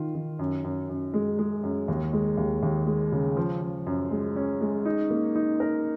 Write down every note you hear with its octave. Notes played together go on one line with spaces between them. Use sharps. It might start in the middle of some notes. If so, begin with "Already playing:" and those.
Already playing: D#3 F4
D#3
F#2
F#2
F#2
G#3
G#3
F#2
D#2
G#3
D#2
D#2
G#3
C#3
F3
F3
F#2
G#3
C#4
G#3
D#4
A#3
D#4
A#4